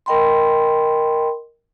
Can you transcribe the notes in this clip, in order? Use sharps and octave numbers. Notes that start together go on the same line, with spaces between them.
A#4 D#5 G5 B5 C6